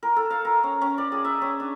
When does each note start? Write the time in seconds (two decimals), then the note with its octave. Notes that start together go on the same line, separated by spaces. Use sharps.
0.03 A#4
0.16 A4
0.30 F5
0.45 A#4
0.63 C#4
0.81 C#4
0.98 D5
1.12 G#4
1.25 E5
1.42 C#4
1.60 D4